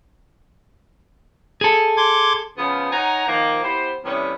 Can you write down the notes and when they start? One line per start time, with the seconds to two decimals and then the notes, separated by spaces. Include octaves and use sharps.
1.61 G#4 A4
1.97 C6 D6 G#6
2.58 C#3 F3 B3
2.92 D#4 C#5 F#5 G#5 A#5
3.28 D#3 F3 A#3
3.64 B3 E4 G4 C5
4.05 C3 E3 G3 A3 B3 C#4